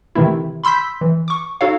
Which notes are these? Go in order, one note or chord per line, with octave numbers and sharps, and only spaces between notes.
C3 D#3 E3 A3 E4
B5 C6 E6 G6 B6
E3
C#6 D6
D#4 F#4 A4 C#5 F5